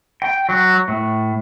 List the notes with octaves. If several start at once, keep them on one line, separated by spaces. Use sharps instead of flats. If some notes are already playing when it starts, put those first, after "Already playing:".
G5
F#3
A2